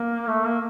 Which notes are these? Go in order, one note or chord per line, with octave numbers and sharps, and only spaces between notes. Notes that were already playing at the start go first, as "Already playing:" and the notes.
Already playing: A#3
A3
A#3